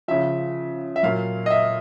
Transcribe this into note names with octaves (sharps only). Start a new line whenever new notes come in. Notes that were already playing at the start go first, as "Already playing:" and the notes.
C#3 F3 E5
E5
A#2 F#3 F5
D#5
E5